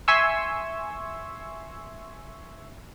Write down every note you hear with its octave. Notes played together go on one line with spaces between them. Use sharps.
E5 G#5 C6 C#6 E6